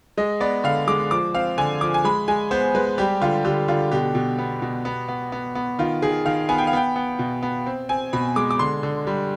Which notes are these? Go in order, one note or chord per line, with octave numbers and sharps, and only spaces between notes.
G#3 D#5
B3 D5
D3 F5
G#3 D6
F3 D6
C4 F5
D3 G#5
F3 D6
G#5
G#3 B5
G#3 G#5
B3 C5
G#3 B4
G3 G4
D3 F4
D3 G4
D3 F4
B2 G4
B2
B3
B2
B3
B3
B3
B3
D#3 F4
D#3 G#4
D#3 F5
B3 G#5
G5
F5
B3 G5
B3
B2
B3
C4
C4 G#5
B2 B5
G#3 D6
D6
D3 C6
D3
G3